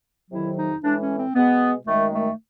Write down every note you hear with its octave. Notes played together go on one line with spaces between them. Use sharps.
F2 C3 D#3 F#3 E4
D#4
A2 E3 G#3 D4
C#4
C4
B2 G#3 B3
F#2 D#3 G#3 A3
A3